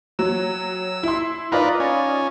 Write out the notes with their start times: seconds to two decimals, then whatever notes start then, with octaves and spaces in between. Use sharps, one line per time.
0.19 F#3 E6
1.03 E4 C6
1.52 D#4 F4 A#4 B4 D5
1.80 C#4